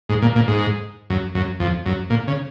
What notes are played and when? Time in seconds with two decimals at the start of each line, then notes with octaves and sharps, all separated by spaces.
0.09 G#2
0.22 A#2
0.36 A#2
0.48 G#2
1.10 F#2
1.35 F#2
1.60 F2
1.86 F#2
2.10 A#2
2.28 C#3